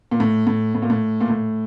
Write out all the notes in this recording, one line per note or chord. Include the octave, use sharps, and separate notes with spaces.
A#2
A2
A2
A2
A#2
A2
A#2
A2